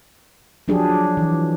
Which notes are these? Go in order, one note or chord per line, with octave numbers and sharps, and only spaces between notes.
F3 F#3 D4 G4 G#4
E3